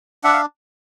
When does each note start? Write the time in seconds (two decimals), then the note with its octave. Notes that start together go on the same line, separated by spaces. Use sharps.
0.24 D4 E5 F#5
0.33 F5